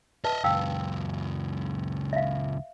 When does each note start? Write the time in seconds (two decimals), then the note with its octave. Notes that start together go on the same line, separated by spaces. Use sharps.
0.24 B4 D#5 E5 A5
0.44 C#2 F#2 F5 G5 E6
2.13 E5 F5